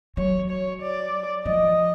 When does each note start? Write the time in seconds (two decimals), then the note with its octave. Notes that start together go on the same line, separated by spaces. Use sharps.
0.17 F#3 C#5
0.50 C#5
0.82 D5
1.45 F3 D#5